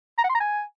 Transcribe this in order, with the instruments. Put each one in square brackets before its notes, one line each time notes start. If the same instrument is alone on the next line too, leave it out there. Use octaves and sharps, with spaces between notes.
[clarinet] A#5
F#5
C6
A#5
G#5